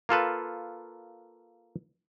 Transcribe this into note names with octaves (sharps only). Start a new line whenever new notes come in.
A#3 F4 A4 B4